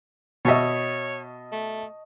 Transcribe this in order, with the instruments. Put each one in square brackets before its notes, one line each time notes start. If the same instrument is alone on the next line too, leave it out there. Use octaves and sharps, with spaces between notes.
[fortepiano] B2 E5 [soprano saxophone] C#5 [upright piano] D#5 A5 C#6
[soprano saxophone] A3